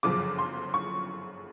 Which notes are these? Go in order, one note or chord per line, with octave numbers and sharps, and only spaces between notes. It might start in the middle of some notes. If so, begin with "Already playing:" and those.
G1 F#2 C#3 F3 D6
C6
C#6